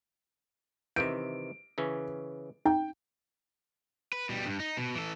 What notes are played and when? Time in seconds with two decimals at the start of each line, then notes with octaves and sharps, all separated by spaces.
0.96 C3 D#3 E3 G6 D7
1.78 C#3 E3 C#4
2.65 D#4 G5
4.13 B4
4.29 B2 G3
4.46 G2
4.60 D#4
4.77 B2
4.95 E3 A4